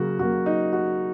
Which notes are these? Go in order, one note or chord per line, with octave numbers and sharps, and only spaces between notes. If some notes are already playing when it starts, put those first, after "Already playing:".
Already playing: C#3 F#3 A#3 F#4
C#3 F#3 A#3 F#4
D#4
F#4